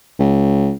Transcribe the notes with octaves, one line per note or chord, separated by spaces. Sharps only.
C#2